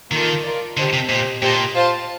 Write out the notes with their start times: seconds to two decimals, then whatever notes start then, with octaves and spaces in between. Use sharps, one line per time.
0.12 D#3 A#3 F4 A4 D#5 A5
0.44 F4 A#4 D5
0.77 D3 G4 C5 D#5 A5
0.93 C3
1.09 A#2 G4 C5 D#5
1.42 A#2 G4 C5 D#5 A5
1.75 F4 C5 F5 A5